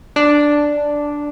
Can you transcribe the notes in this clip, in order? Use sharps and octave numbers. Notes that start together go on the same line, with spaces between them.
D4